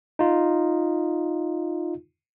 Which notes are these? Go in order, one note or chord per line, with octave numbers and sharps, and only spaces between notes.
D#4 F4